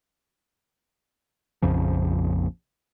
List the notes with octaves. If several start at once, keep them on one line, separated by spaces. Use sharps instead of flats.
A#1 F2 C#3 F3